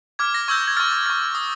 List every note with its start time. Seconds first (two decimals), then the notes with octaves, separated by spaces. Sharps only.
0.19 D6 F6 G#6
0.34 A#6
0.48 C#6 E6 G6 G#6
0.68 G#6
0.77 C#6 F6 A6
0.92 A6
1.06 C#6 F6 G#6
1.35 D#6